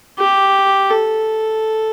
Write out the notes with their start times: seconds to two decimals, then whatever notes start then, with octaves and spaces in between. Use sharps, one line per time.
0.19 G4
0.91 A4